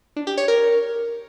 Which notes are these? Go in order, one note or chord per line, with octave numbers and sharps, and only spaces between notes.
D4
G4
C#5
A#4